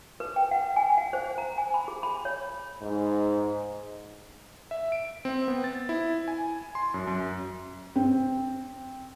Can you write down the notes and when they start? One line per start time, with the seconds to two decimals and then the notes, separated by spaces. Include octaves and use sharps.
0.20 B4
0.36 G5
0.51 F#5
0.76 G#5
0.98 F#5
1.13 C5
1.38 A#5
1.58 G#5
1.74 B5
1.88 G#4
2.03 B5
2.25 C#5
2.82 G#2
4.71 E5
4.92 D7
5.25 C4
5.48 B3
5.64 A6
5.89 E4
6.28 G#5
6.75 C6
6.94 F#2
7.07 F#2
7.96 C4